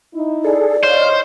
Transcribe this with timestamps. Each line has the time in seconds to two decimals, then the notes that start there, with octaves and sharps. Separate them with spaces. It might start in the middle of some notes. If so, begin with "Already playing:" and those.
0.14 D#4 E4
0.44 G#4 A4 D5
0.83 C5 C#5 D#5 F5